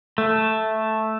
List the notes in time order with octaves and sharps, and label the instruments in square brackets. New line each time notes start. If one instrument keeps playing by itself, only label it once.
[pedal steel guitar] A3